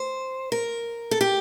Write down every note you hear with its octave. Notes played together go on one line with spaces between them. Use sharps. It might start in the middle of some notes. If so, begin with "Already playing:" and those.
Already playing: C5
A#4
A4
G4